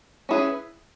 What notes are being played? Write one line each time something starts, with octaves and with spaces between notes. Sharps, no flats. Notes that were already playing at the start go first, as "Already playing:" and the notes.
C#4 E4 G#4 B4